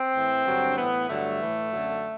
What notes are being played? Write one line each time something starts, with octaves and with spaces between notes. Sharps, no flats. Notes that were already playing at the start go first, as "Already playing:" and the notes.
Already playing: C4
A2 E3
G2 D3 F#3
A2 E3 B3
G2 D3 F#3 A3
A2 E3
F#2 D3 F#3